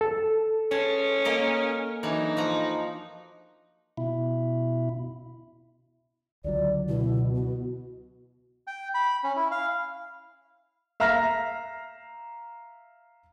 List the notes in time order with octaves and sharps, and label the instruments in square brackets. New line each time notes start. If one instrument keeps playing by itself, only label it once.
[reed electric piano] A4
[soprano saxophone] C#4 [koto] G#4 A5
[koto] A#3 A#4 D#5
[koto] E3 F#3 D4 [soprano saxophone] D#4
[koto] F3 F#4 A#5
[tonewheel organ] B2 E4
[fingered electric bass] C#2 D3 F#3 [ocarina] D5
[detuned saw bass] B2 [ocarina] E4
[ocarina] F#4
[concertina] G5
B5
C#4
E4
F5
[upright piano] E5 F5 A#5 F6 A#6